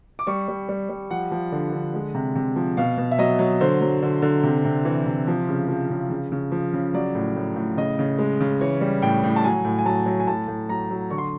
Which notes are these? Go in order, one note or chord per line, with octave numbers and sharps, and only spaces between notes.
D6
G3 C#6
G3
G3
G3
F3 F#5
F3
D3
D3
G#3
C3
C3
F3
B2 F5
B2
E5
F#3 D#5
F#3
D3 C5
F#3
D3
D3
C3
C3
E3
C3
F3
C#3
F3
C#3
C#3
C#3
F3
C#3
F#3 D5
A2
A2
A2
C#3 D#5
C#3
G#3
C#3
E3 C#5
G3
A2 G5
A2
A5
F#3 G#5
A2
G#5
F#3 A5
F#3
G#5
A2 A5
A2
F#3 A#5
F#3
D3 C#6
C6